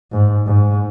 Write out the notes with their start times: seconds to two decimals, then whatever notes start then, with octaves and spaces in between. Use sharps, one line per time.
0.12 G#2
0.46 G#2